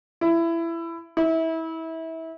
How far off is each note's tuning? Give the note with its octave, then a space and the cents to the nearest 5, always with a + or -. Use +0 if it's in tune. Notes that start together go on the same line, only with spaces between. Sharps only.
E4 +20
E4 -25